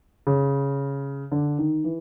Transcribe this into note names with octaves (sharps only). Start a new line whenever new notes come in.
C#3
D3
D#3
E3